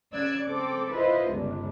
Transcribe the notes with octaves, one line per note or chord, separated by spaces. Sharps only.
C#3 D5 E6 F#6 G#6
C4 A4 D6
E4 F4 B4 C5 D#5
G1 C#2 G2 D4